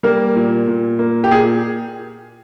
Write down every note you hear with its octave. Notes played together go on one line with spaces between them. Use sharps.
G3 A#3 A#4
A#2
A#2
A#3
G4
A#2 G#4